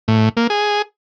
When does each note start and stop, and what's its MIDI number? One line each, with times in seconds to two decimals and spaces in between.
0.08 0.29 45
0.37 0.47 58
0.50 0.82 68